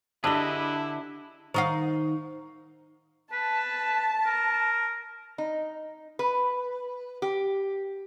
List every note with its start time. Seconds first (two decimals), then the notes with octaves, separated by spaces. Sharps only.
0.24 D3 D4 E4 G4 G#4 B4 D#5 E5
1.54 D#3 D#4 C5 F5 A#5 C#6
3.33 B4 A5
4.26 A#4
5.38 D#4
6.19 B4
7.22 G4